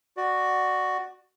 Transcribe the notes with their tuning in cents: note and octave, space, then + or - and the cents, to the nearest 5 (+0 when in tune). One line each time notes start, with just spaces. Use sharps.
F#4 +0 D5 +15